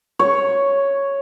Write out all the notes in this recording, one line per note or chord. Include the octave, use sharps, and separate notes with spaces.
C#5